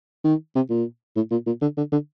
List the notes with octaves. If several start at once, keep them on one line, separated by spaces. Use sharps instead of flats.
D#3
C3
A#2
A2
A#2
A#2
D3
D3
D3